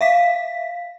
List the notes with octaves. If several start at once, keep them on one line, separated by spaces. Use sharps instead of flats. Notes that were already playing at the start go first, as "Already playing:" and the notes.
E5 F5 B6